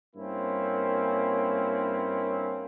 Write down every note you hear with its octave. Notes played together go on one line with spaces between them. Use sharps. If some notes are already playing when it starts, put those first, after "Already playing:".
G2 A#3 C4 C#4 E4